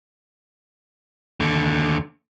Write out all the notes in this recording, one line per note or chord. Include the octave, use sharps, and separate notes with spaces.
D#2 D3